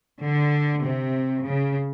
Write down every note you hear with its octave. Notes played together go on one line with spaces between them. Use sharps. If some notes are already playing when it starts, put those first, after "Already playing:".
D3
C3
C#3